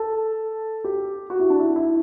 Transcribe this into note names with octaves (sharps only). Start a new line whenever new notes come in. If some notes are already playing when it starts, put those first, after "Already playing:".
Already playing: A4
G4
F#4
E4
D4
E4
E4